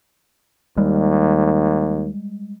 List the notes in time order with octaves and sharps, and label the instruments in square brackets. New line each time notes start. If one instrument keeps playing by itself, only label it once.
[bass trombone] D#2 [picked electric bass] G3 G#3